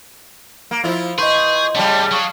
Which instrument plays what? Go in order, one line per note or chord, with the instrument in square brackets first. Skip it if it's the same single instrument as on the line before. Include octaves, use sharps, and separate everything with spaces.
[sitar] A#3
F3 E4 F4
[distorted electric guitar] G#4 [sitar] B4 [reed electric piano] D#5 C6 [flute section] C#6 G6
[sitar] C#3 G3 [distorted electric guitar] A3 G4 [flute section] G5 A5 D6
[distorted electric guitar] F#3 [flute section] F5 C#6 D#6